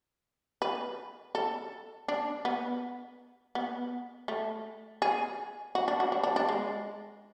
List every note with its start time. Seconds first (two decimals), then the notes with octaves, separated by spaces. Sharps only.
0.62 B4
1.35 A4
2.08 D4
2.45 B3
3.55 B3
4.28 A3
5.02 G#4
5.75 F#4
5.88 D4
6.00 F#4
6.12 D4
6.23 D4
6.36 D4
6.49 G#3